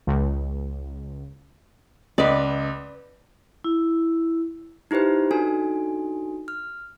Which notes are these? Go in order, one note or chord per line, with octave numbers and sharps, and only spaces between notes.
C#2
C#2 B4 D5 D#5
E4
D#4 E4 G4 B4 C5
D4 D#4 F#4 A4 G#5
F6